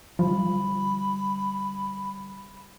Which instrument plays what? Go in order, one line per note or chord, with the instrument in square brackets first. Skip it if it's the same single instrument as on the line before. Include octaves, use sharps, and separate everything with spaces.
[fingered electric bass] D3 G3 [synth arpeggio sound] F3 [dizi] B5